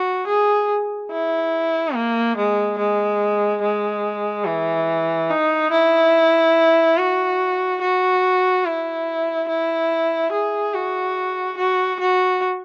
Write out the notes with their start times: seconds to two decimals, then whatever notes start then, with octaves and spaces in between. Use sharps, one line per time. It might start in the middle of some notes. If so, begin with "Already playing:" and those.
Already playing: F#4
0.27 G#4
1.12 E4
1.95 A#3
2.37 G#3
2.79 G#3
3.62 G#3
4.46 E3
5.30 D#4
5.72 E4
6.98 F#4
7.81 F#4
8.65 E4
9.49 E4
10.32 G#4
10.74 F#4
11.57 F#4
12.00 F#4